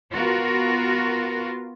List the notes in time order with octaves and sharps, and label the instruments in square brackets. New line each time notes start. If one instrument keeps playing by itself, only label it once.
[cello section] B3 F4 F#4 A#4